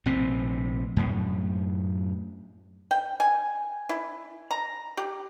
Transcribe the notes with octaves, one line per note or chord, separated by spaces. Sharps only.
A#1 A2 C3 C4
F#2 A2
G5
G#5
E4
A#5
G4